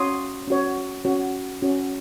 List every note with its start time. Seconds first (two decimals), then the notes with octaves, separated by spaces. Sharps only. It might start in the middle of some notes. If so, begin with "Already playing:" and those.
Already playing: C#4 F#4 C#5 C6 D#6
0.47 C#4 F#4 C#5
1.05 C#4 F#4 C#5
1.62 C#4 F#4 C#5